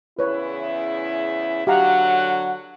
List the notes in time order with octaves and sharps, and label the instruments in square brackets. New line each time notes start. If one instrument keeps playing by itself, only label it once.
[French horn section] E2 C#3 E4 [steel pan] B4 C#5
[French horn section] D3 F#3 [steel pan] G4 F5 A#5 [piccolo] F#5